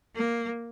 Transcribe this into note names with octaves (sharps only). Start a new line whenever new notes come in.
A#3